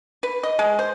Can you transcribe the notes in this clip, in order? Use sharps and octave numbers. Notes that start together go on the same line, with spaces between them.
B4
D#5
G#3
C5